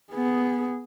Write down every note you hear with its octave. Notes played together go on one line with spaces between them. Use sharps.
B3 G#4